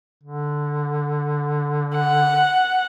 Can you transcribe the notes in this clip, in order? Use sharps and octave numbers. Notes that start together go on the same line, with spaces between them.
D3
F#5